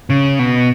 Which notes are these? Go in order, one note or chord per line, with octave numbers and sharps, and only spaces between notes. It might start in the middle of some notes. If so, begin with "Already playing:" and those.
C#3
B2